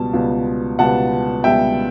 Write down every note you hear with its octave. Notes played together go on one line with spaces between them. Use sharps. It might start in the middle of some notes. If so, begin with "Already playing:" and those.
Already playing: C#2 B2 G3 B3 A5
C#2 B2 G3 B3
C#2 B2 G3 B3 F#5 A5
C#2 B2 G3 B3 E5 G5